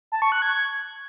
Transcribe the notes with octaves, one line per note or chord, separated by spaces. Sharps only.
A5
C#6
F#6
G#6